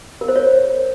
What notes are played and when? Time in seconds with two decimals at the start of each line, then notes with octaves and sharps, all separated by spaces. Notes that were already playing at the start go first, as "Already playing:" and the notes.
0.21 A#4
0.28 C5
0.36 C#5